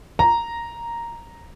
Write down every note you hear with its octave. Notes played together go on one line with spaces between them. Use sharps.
A#5